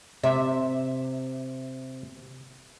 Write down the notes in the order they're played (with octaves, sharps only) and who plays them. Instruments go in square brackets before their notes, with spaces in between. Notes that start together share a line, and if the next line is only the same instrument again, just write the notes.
[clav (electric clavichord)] C3 [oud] E5